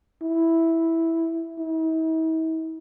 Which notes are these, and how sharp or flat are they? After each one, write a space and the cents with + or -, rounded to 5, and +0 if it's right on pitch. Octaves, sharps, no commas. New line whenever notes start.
E4 -5
E4 -45